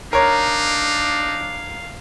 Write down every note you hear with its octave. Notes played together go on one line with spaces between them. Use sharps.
D4 D#4 A#4 C#5 F5